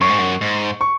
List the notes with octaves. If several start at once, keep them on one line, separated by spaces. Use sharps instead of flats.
F#2 C#6
G#2
F#2
G#2
C#6